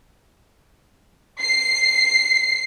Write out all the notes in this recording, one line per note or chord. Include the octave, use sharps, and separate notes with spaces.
C7